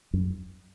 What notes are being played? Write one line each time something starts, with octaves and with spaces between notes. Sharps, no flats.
F#2